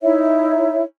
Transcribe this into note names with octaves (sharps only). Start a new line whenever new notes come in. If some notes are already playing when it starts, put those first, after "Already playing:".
D#4 E4 C#5 E5